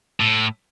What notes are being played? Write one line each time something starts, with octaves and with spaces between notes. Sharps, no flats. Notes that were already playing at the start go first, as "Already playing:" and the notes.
A2